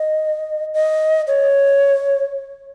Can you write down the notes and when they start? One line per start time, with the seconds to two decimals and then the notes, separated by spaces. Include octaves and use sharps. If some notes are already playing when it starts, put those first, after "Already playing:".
Already playing: D#5
0.74 D#5
1.27 C#5